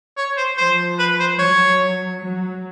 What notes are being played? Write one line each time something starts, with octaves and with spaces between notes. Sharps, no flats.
C#5
C5
F3 C5
B4
C5
F#3 C#5
F#3